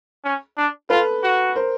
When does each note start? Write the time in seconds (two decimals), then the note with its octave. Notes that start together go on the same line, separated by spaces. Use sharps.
0.24 C#4
0.57 D4
0.90 F4 A4 B4
1.23 F#4
1.56 A#4 C5